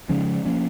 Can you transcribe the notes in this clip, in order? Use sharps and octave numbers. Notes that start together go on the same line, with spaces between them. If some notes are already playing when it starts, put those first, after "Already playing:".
C#3 F3 G#3 C#4
F3 A#3 C#4